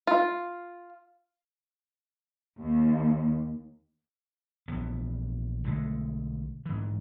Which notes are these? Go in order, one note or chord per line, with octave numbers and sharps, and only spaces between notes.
F4
D#2
A#1 E3 B3
B1 D3 G#3 A3
G#2 E3